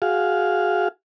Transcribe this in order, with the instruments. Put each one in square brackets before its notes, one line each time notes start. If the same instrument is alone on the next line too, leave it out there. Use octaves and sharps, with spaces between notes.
[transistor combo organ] F#4 G#4 F5